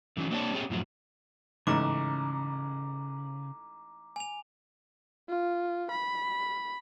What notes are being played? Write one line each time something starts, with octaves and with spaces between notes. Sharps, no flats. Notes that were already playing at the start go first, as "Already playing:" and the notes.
D3 E3 F#3 C#4 D#4
A#3 C4 D4 G4 C#5 A5
B3 C#4 G4 G#4
F#2 A2 F3 F#3
A1 G#2 C#3 A#5 D6
G#5 F7
F4
B5